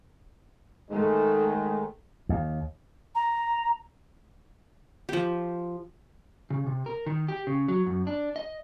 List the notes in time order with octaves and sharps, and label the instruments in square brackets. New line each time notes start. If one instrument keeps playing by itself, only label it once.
[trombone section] G#2 D#3 G#3 [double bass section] A3
[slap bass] D#2
[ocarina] A#5
[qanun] F3 G4
[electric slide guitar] C#3
C3
A#4
D#3
G4
C#3
F#3
F#2
D4
D#5